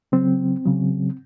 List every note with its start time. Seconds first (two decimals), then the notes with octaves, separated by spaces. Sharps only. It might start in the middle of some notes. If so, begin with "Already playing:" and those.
0.12 C#3 F#3 C4
0.66 C#3 F#3